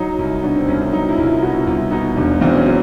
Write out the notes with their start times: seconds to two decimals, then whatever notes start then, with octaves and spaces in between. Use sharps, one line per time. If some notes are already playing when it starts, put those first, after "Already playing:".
Already playing: F#3 D#4
0.19 C2
0.43 B2 D4
0.56 C4
0.68 C2 C#4
0.81 D4
0.93 F#3 D#4
1.09 E4
1.18 C2
1.26 F4
1.42 B2 F#4
1.67 C2 F4
1.91 B2 D#4
2.16 E1 D4
2.41 E2 C4
2.57 C#4
2.66 F#3